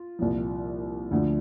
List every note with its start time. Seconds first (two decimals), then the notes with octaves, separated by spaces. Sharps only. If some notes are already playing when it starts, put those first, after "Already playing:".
Already playing: F4
0.19 C2 A#2 F3
1.11 D2 D3 F3